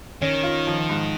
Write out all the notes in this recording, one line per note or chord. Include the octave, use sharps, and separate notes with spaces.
D#3 C#4
F4
F3
G#2